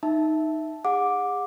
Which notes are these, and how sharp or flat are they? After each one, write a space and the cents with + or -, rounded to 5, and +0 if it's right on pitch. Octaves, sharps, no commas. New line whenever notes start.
D#4 +0 E5 +0 A5 -5
G#4 -30 F#5 -30 D6 +0